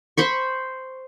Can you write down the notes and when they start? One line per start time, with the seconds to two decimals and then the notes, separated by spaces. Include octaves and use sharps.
0.17 C5 B5 C#6